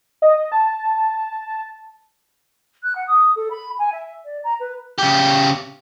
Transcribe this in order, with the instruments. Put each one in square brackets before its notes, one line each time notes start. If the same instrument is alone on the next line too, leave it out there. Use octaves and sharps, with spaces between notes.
[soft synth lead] D#5
A5
[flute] F#6
F#5
D#6
A4
B5
G#5
E5
D5
A#5
B4
[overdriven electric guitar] C#3 G4